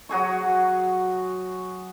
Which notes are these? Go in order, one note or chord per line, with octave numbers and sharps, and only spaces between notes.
F#3 F#4 G#4 C#6